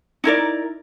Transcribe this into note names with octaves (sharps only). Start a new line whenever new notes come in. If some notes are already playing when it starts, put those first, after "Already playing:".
D#4 E4 A#4 D5